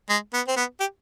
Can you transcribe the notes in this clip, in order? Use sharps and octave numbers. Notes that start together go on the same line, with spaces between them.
G#3
B3
C4
B3
G4